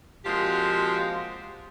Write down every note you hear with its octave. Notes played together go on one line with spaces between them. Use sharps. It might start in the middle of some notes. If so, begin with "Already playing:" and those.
A#2 F3 G#3 C4 F#4 G4